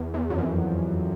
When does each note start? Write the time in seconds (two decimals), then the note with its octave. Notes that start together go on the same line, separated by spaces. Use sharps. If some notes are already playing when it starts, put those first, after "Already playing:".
Already playing: E2
0.14 E2
0.30 F#2
0.38 F2